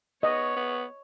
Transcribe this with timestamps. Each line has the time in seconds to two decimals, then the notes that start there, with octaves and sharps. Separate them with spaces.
0.23 B3 C#5 D#5
0.57 B3